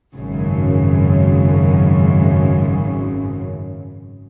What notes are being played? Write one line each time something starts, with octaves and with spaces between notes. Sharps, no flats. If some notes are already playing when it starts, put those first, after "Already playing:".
G#1 F#2 C#3